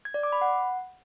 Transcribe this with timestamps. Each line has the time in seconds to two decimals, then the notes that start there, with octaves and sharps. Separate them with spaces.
0.05 G#6
0.14 D5
0.23 D6
0.32 B5
0.42 F#5